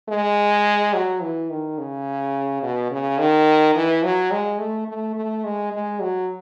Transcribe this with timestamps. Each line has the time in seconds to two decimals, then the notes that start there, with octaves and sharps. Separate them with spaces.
0.09 G#3
0.94 F#3
1.22 E3
1.50 D#3
1.78 C#3
2.63 B2
2.91 C#3
3.19 D#3
3.75 E3
4.03 F#3
4.31 G#3
4.59 A3
4.88 A3
5.16 A3
5.44 G#3
5.72 G#3
6.00 F#3